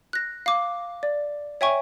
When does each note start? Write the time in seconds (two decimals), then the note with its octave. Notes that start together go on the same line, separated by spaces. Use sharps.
0.13 F#6 A#6
0.46 F5 D6
1.03 D5
1.61 C#5 E5 G5 G#5 C#6